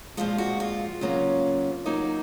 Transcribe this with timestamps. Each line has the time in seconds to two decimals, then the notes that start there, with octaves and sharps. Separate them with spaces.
0.17 A#2 F3 G#3 F4
0.38 F#4
0.60 F4
1.01 C#3 F#3 A#3 C#4
1.86 F#3 A#3 D#4